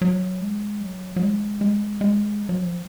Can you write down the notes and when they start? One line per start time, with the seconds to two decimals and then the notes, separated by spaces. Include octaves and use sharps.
0.02 F#3
0.41 G#3
0.81 F#3
1.16 F#3
1.21 G#3
1.61 G#3
2.01 G#3
2.49 F#3
2.61 F3